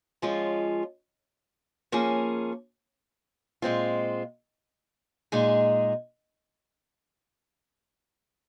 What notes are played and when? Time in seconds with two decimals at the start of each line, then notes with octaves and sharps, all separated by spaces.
0.22 F3 G#3 C#4 F4
1.92 F3 A#3 C#4 G#4
3.62 A#2 G#3 C4 F4
5.32 A#2 G#3 D#4 G#4